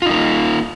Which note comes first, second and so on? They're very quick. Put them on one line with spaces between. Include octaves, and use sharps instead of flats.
F4 D#4 A#4 A#3